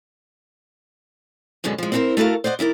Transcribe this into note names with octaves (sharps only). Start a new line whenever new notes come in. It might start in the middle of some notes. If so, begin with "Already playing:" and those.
F#2 B2 D3 G#3
F3 G#3
C4 E4 G4 A4 A#4 C5
A3 F#4 A4 A#4 F5
C5 D5 D#5 F#5
D#3 E4 A#4 D5